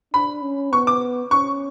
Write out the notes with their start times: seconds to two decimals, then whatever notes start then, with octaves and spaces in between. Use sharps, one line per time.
0.14 D4 B5
0.42 C#4
0.72 B3 C#6
0.87 D6
1.31 C#4 C#6